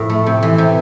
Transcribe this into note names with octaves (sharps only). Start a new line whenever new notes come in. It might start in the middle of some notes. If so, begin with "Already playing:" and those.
Already playing: A2 F3
A3
C3
E3
C3